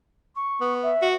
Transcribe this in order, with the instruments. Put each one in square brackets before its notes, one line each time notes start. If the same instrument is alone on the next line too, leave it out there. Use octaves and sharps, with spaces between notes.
[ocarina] C#6
[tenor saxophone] B3
[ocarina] E5
[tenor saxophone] F#4